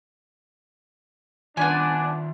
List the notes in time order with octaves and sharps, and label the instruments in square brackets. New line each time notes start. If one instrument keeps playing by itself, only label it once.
[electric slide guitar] D#3 F4 [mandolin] B3 G#5 [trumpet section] D4